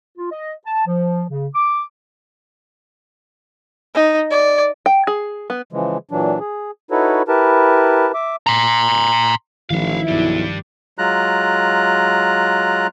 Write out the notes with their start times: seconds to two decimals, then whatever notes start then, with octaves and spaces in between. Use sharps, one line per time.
0.18 F4
0.32 D#5
0.66 A5
0.87 F3
1.30 C#3
1.55 D6
3.95 D#4
4.31 D5
4.86 G5
5.07 G#4
5.50 B3
5.73 C#3 E3 F3 G#3
6.11 A#2 E3 F#3 D4
6.40 G#4
6.91 D#4 E4 F#4 A4 B4 C#5
7.28 E4 G4 A#4 B4 A5
8.14 E5 D6
8.47 A#5 C6
9.70 A1 D#3 F3 E4 E5 F5
10.08 B1 G2 G3
10.98 F#3 G#3 F4 A#5 F#6